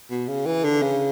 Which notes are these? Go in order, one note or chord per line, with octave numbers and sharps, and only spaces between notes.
B2
C#3
E3
D3
C#3